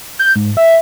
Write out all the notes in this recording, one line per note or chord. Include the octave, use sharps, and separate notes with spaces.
G6
G#2
E5